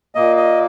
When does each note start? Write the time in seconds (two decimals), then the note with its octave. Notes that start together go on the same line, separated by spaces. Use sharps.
0.15 A#2 A#3 D#5
0.37 D#5